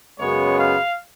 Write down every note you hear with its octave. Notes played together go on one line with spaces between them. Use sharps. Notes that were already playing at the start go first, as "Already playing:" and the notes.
F#2 C#3 G#3 B3 C#5
F5